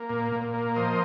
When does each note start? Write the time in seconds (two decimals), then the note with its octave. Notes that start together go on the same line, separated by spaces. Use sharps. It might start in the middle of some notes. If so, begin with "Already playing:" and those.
Already playing: A#3
0.10 A#2
0.32 A#2
0.54 A#3
0.76 F3 C5 D#5